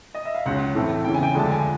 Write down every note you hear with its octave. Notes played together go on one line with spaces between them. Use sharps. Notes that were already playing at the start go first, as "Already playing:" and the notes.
D#5
E5
F5
C#2 C#3 F#3 F#5
A2 E3 A3 C4
E2 C#3 E3 G5
G#5
G5
D2 D3 F3 G#3 A5
G#5